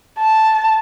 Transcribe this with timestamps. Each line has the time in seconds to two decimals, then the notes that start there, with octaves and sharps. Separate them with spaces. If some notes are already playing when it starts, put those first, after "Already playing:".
0.19 A5